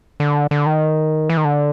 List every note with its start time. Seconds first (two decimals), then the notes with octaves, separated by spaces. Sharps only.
0.20 D3
0.51 D3
0.66 D#3
1.30 E3
1.37 D#3
1.45 D3